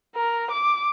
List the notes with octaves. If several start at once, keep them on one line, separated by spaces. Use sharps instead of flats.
A#4
D6